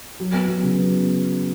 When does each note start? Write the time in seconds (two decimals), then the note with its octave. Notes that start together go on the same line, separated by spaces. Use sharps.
0.20 F#3
0.34 B3
0.48 F#3
0.63 C#3
0.78 B3